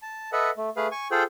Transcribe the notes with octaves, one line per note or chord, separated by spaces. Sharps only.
A5
A4 B4 D#5 E5 F#5
A3
A3 G#4 B4 F5
G#5 C#6
F4 G#4 A4 C5 G5